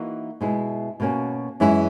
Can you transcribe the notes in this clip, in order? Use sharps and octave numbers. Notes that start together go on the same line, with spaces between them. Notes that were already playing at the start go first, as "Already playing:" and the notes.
Already playing: E3 A#3 D#4 F#4
B2 G#3 B3 E4
B2 A#3 C#4 F#4
F#2 E3 G#3 C#4 E4